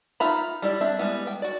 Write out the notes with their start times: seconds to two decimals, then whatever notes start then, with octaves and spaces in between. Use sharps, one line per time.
0.20 D#4 F4 E5 A#5 B5
0.62 G3 E4 D5
0.81 C4 D4 E5
0.98 G3 G#3 B3 E4
1.27 G5
1.42 F#4 D5